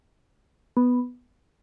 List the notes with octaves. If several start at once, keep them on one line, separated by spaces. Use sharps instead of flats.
B3